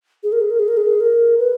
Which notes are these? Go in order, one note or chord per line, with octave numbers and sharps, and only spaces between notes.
G#4
A#4
G#4
A#4
G#4
A#4
G#4
A#4
B4